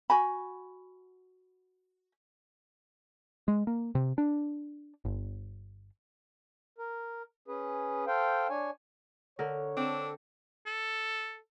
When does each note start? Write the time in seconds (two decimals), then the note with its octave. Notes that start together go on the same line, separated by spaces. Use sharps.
0.10 F#4 G#5 B5
3.48 G#3
3.67 A#3
3.95 C3
4.18 D4
5.05 G1
6.78 A#4
7.48 C#4 G#4 B4
8.07 A4 C5 F5 G5
8.50 D4 C#5 G#5
9.39 D3 A#4 C#5
9.77 C4 D4 A4
10.66 A4